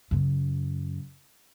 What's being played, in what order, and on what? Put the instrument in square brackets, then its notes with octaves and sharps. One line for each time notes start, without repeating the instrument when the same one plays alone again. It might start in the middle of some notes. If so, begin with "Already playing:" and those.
[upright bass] F#2 C#3